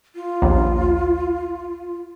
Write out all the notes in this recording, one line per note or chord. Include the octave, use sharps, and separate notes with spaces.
F4
A#1 D#2